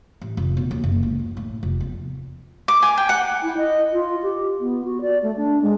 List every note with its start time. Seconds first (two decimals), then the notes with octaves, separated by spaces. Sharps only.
0.21 A1
0.37 F1
0.57 B2
0.71 D#2
0.84 F#1
1.03 C#2
1.19 A#2
1.37 A2
1.63 F1
1.80 E2
2.68 D6
2.82 G#5
2.98 G5
3.09 F#5
3.43 E4
3.57 D#5
3.93 F4
4.23 G4
4.60 B3
4.85 F#4
5.01 D5
5.23 A3
5.37 D4
5.62 G#3